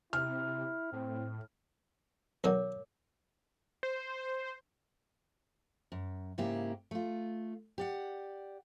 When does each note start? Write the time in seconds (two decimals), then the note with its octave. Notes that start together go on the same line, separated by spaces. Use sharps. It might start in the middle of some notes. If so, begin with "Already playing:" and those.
0.13 C3 E4 F6
0.92 A2 C4
2.44 B1 D#3 F#3 A#4 C#5 D6
3.83 C5
5.92 F#2
6.38 G#2 C#3 A#3 E4 G4
6.91 A3 F4
7.78 G4 D5 F#5